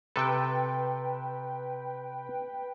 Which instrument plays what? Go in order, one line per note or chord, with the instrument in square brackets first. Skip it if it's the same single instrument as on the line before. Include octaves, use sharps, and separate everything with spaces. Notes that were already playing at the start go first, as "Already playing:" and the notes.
[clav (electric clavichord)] C3 A4 [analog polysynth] B4 G5